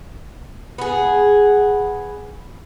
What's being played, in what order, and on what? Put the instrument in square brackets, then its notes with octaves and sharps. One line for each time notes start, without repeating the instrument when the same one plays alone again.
[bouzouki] B3 G#4